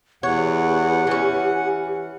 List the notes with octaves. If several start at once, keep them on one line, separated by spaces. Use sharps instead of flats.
E2 G4 C#5 F#5
E3 C#4